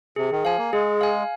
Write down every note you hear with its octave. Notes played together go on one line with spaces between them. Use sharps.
C3 G#4
D#3
F3 F5 G#5
A#3
G#3 G#4
F5 G#5